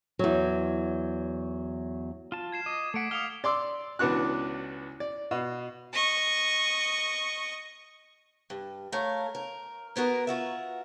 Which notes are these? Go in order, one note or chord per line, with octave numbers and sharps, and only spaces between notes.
E2 F#3
F4 A5
G#6 C7 E7
D#5 D6
A3 F#5 B6 D7 E7
F5 F#5 D#6 F6 F7 G7
D5 C6 D6 E6
C#2 E3 B3 D4 F#4 F#6
D5
B2
D#5 C#6
G2
A3 A#4 C#5 F5
A#4
A#3 B3 F#4 A#4
F4 F#4 E5